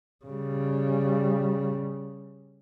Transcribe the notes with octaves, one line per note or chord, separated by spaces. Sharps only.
C#3 G3